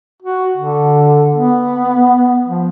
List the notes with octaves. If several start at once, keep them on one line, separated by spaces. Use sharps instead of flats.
F#4
D3
B3
F3